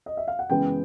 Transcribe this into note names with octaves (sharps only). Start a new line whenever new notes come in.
D#5
E5
F5
F#5
F#2 C#3 E3 G#3 B3 G5